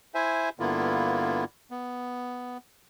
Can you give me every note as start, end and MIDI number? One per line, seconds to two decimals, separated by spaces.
0.14 0.49 64
0.14 0.49 72
0.14 0.49 76
0.14 0.49 80
0.60 1.44 43
0.60 1.44 50
0.60 1.44 58
0.60 1.44 59
0.60 1.44 64
0.60 1.44 65
1.71 2.58 59